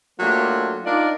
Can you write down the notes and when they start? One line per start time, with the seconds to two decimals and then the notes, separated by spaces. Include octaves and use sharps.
0.20 F#3 A3 A#3 D4 F4 G4
0.85 D4 D#4 F4 A#4 D5